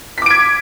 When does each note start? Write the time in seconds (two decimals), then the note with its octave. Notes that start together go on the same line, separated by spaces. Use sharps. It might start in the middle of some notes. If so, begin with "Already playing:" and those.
0.18 B6
0.22 D6
0.26 D7
0.30 G#6